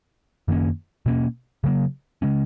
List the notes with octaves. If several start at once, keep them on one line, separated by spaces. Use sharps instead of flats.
F#2 D#3 A#3 C#4
B2 A#3 C#4
C#3 F#3 A#3
C#3 G#3 C#4